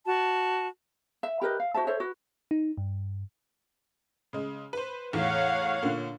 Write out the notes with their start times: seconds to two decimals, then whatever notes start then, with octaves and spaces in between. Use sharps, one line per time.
0.07 F#4 A5
1.23 E5
1.41 G4 A#4 B4 D#5
1.60 F5
1.74 F#4 C5 E5 A5
1.87 A4 C5 C#5 E5
2.00 F#4 B4
2.51 D#4
2.78 G2
4.33 C#3 G#3
4.73 B4 C5
5.13 E2 A2 C#5 F5 F#5
5.83 A#2 D3